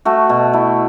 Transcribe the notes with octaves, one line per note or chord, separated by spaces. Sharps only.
A3 F#4
B2
A3 E4